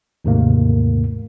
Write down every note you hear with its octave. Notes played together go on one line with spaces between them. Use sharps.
D#2 G#2 C3 D#3 A3 A#3